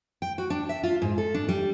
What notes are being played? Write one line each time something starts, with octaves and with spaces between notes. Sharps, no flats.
G5
F#4
D4
E5
F4
G#2
A4
D4
G3